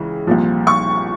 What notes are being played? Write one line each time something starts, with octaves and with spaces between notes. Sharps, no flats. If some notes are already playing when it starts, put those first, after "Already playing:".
Already playing: C#2 C#3 E3
C2 A#2 F3
C#6